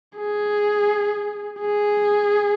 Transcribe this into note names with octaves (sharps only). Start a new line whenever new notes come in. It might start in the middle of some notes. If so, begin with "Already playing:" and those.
G#4
G#4